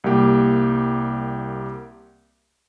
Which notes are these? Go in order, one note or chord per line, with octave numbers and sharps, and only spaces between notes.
C2 G3 A#3 G4